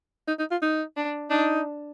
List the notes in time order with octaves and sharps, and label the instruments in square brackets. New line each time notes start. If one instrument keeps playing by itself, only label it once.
[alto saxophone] D#4
D#4
F4
D#4
[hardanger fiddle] D4
[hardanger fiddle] D4 [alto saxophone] D#4